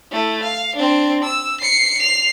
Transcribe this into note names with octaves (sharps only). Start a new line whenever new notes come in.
A3 E4
F5
C4 D4
E6
C7 C#7
C7 F7